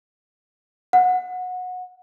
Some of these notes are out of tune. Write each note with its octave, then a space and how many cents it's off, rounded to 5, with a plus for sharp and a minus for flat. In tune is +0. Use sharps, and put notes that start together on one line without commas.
F#5 -20